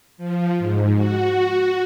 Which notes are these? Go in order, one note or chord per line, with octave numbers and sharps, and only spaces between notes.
F3
G#2
F#4